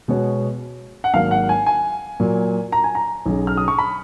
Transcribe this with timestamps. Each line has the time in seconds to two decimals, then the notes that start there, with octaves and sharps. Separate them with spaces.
0.08 B2 G#3 B3 F#4 C#5
1.04 F#5
1.14 G#1 G#2 F#3 A#3 F5
1.31 F#5
1.49 G#5
1.66 G#5
2.20 A#2 F#3 A#3
2.72 A#5
2.84 G#5
2.95 A#5
3.26 B1 B2 F#3 C#4 G#4
3.47 F6
3.57 D#6
3.68 C#6
3.79 B5